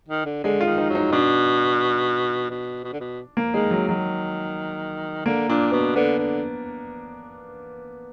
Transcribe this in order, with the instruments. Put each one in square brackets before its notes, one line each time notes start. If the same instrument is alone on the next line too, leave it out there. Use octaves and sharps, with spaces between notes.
[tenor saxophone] D#3
D3
[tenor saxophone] D3 [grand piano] G#3
[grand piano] F4
[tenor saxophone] D#3
[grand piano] D#4
[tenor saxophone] F#3
[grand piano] D#4
[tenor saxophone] B2 [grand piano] D4
[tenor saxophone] B2
B2
D3
B2
[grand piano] A#3
[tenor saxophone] D#3 [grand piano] G#3
[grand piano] F#3
[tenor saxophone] D#3 [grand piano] F#3
[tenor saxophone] D3 [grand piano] A#3
[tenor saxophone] A#2 [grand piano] D4
[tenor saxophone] B2 [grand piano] B3
[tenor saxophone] D3 [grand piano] B3
[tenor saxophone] D3